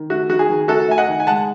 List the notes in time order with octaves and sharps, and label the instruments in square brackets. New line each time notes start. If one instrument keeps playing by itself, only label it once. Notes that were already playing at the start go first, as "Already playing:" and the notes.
Already playing: [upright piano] D#3
A3 F#4
D#3 F#4
G#4
D#3
A3 F#4 A4
A3 G#5
D#5 F#5
D#3
G#5
G#3 F#5 A5